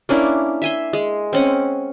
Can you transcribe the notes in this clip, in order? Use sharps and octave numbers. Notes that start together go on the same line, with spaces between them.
A#3 C#4 D4 E4
E5 G#5 C6
G#3
C4 C#4 F#5